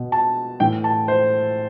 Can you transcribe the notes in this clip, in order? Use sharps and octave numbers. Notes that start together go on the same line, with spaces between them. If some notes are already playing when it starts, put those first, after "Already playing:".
Already playing: B2
A5
A2 E3 G5
A5
C5